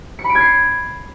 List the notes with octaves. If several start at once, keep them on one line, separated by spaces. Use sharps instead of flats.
C#7
B5
D7
G#6
C7